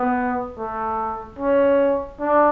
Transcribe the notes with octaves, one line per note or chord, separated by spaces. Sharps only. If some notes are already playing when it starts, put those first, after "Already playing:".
Already playing: B3
A3
C#4
D4